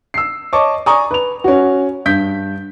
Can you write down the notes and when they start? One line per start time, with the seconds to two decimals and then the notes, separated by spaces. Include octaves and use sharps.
0.14 E6 C7
0.53 C#5 D#5 A5 C#6 D6
0.86 D5 G#5 A#5 C#6 D#6
1.11 B4 F7
1.44 C#4 F#4
2.06 G2 G6 B6